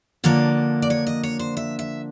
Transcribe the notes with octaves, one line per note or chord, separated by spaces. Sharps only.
D3 F3 A#3 D4 C#5
D5
C#5
D#5
C#5
C5
E5
E5